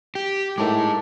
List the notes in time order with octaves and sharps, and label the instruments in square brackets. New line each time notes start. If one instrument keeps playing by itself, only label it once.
[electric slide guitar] G4
[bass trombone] A2 [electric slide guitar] G#3 D#4 [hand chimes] A#4 A5 D6